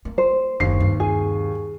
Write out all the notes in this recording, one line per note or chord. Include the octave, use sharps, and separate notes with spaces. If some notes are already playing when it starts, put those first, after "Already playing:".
A#3
C5
F#1 D#2 C7
G2 C3
G#4 G#5